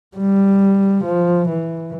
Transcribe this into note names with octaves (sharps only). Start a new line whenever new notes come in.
G3
F3
E3